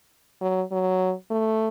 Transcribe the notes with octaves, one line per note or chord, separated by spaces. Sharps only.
F#3
F#3
A3